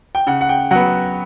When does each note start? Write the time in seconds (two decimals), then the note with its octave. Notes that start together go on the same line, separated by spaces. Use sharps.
0.15 G5
0.27 C#3 F#5
0.41 F#5
0.49 G5
0.71 F#3 B3 F#5